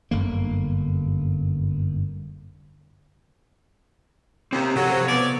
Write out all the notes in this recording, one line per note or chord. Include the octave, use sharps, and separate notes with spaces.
G1 F#2 D3 A#3
D#2 C4 G4
C3 F#3 G4 A4 F#5
C5
F2 B3 C#5 D5